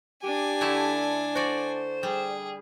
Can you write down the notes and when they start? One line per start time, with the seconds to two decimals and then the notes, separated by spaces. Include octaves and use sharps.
0.23 D4 G4 G#5
0.61 D3 A3 E4
1.35 F#4 C5 D5
2.03 G3 G#4